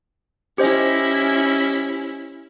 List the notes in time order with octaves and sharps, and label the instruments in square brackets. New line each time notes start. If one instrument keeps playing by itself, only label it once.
[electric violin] C#4 E4 [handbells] G4 C5 D#5